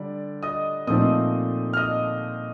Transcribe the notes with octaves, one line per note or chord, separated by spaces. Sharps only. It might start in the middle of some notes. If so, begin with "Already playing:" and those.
Already playing: D3 G3 D5
D#5 D#6
A#2 F3 A3 C4 D#4 D#5 D#6
F6
D#5 D#6